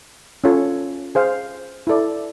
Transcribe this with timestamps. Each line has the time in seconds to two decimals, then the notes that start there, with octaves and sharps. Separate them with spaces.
0.44 C#4 F4 A4 C#5
1.15 G#4 C5 F5
1.87 E4 A4 D5